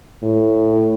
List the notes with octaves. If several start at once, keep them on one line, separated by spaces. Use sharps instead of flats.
A2